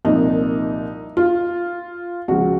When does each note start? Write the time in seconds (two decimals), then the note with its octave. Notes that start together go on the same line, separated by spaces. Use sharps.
0.05 C2 A#2 F3 D#4
1.17 F4
2.28 C#2 C#3 F3 F#4